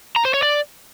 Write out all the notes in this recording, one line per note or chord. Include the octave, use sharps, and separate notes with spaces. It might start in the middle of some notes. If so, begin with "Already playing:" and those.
A#5
C5
C#5
D5